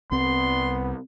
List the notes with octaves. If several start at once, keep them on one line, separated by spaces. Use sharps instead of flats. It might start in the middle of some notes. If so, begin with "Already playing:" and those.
C2 B3 C4 C6